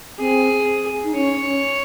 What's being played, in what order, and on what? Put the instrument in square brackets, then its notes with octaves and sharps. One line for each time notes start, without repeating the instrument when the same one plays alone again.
[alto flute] C4 [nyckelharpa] G#4
[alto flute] D#4
[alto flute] C#4 [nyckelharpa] C#5